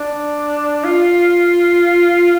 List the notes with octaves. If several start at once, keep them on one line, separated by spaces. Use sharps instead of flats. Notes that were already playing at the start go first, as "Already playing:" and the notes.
Already playing: D4
F4